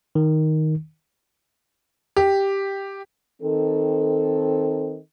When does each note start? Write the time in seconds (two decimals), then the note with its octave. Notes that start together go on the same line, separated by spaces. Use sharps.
0.15 D#3
2.17 G4
3.42 D#3 C4 A4